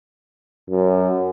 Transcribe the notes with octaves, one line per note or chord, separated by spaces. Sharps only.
F#2